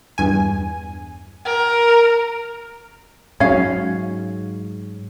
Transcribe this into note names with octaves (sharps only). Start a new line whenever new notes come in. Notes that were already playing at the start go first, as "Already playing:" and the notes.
E2 G2 G#5
A#4
G#2 F#3 C#4 F5